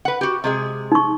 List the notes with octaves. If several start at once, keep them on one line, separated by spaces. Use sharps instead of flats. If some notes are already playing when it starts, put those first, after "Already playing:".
B4 F#5
F#4 G4
C3 G#3 G#4
D#4 C#6